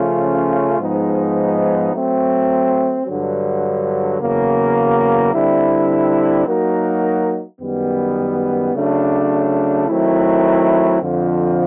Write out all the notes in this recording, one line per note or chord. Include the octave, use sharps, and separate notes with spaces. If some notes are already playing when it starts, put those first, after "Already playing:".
Already playing: C#3 F3 A3 C#4 F4
G#2 F3 G#3 B3 D#4
F#3 A3 C4
G2 D3 F#3
E2 C#3 F#3 A#3
D3 G3 C4 E4
F#3 A#3 D#4 F#4 A#4
F#2 D#3 G3 B3
C#3 F#3 A3 D4
D#3 F#3 A3 C4 E4
F2 D3 F3